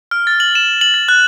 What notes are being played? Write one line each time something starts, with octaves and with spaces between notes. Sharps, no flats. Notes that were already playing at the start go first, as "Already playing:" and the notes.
F6
A6
F#7
E7
F#7
A6
F#6